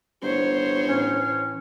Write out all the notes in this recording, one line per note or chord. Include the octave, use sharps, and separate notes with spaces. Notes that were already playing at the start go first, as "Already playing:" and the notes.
G1 C5 C#5
A2 E3 C#4